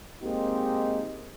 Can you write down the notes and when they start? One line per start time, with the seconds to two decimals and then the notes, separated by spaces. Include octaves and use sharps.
0.23 G#3 A#3 C4 D#4 G4